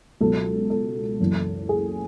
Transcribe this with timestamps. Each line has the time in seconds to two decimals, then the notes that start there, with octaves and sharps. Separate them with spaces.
0.21 C#2 B2 F#3 A4
0.70 A4
1.20 F#1 F#2 E3
1.69 G#4